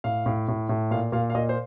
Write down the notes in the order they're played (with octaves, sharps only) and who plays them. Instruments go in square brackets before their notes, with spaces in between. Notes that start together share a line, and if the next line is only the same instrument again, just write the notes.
[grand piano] A2 F5
A2
A2
A2
A#2 F5
A#2 F5
F5
A#2 D#5
C5